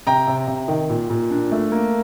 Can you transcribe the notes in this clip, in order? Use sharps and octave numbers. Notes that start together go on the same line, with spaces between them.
C3 G5 A#5
C3
C3
D#3
A#2
A#2
D4
A3
A#3